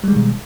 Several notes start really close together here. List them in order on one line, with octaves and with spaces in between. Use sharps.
G3 G#3 D#3 B2